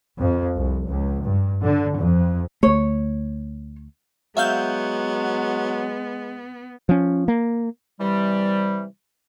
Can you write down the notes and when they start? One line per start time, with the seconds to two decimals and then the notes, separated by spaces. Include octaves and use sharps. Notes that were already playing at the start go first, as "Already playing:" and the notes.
0.17 F2
0.55 C2
0.87 C#2
1.24 G2
1.62 D3
1.97 F2
2.63 D2 A3 C#5
4.37 F#3 G#3 B3 E5 F5 G6
6.89 F3 C#4
7.28 A#3
8.00 C3 E3 G3